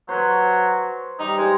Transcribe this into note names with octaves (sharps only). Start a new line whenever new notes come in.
F#3 B4 C5
G3 D#4
G#3 C5